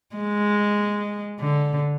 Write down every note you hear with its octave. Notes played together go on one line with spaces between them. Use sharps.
G#3
D3